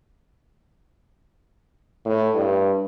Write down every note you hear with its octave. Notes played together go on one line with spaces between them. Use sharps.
A2
G2